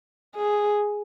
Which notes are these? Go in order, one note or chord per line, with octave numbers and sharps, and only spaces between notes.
G#4